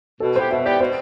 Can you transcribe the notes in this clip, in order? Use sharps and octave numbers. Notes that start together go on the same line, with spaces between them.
B2 A4
B3 E4 G4 C5
B2 E5
B3 E4 G4 D5
B2 C5